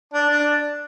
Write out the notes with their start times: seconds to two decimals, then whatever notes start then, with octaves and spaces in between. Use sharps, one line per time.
0.14 D4
0.30 D4